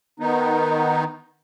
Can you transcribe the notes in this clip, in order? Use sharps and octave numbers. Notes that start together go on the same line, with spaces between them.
D#3 B3 D#4